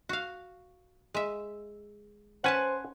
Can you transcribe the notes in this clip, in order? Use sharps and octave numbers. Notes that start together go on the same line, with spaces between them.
F#4 F5
G#3 E5
C#4 B4 C5 F#5 G#5 A5